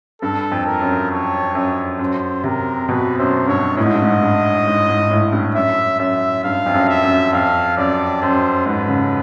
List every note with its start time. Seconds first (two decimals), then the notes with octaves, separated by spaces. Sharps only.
0.22 G2 A4
0.52 F2
0.67 A#4
0.81 F#2
1.11 C#5
1.55 F#2
1.99 F#2 C5
2.44 C3 A#4
2.89 B2 B4
3.18 F#2 C5
3.48 G2 C#5
3.77 A2 D#5
3.85 G#2
3.94 G2
4.02 G#2
4.22 G2
4.67 G#2
4.89 G#2
5.11 A2
5.33 G2
5.55 F#2 E5
6.00 F#2 E5
6.44 G2 F5
6.66 F2
6.74 F#2
6.89 E5
7.04 F#2
7.33 F2 F5
7.77 F#2 D5
8.22 F#2 C5
8.66 G#2 B4
8.88 C#3